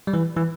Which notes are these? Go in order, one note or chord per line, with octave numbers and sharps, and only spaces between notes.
G3
E3
E3